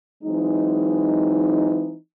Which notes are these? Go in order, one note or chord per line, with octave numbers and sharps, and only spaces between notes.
E3 F#3 G#3 C4 D#4